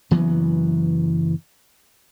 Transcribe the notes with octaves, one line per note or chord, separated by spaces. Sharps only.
F#1 E3 F#3 B3